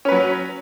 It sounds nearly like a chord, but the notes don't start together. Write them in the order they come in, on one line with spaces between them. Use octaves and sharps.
C#4 B4 F#3